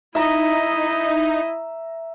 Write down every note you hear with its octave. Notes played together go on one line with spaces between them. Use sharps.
D#4 E4 D#5 E5 A#5